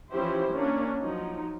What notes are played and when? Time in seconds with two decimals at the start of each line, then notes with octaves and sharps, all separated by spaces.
0.11 E3 F3 C#4 E4 G4 C5
0.53 A#3 C#4 D4 C#5
1.01 F3 F#3 D#4